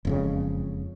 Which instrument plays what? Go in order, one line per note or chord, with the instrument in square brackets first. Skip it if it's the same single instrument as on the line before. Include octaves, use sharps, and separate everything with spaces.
[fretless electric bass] E1 F2 C#3